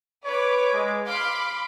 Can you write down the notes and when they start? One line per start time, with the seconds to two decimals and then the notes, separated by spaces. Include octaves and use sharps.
0.25 B4 C#5 D6
0.73 G#3
1.07 F5 B5 C6 D6